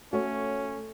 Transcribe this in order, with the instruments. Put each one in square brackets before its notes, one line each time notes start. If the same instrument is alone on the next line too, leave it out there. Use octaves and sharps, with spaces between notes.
[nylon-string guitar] A3 [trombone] C#4 [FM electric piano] F#4 C#5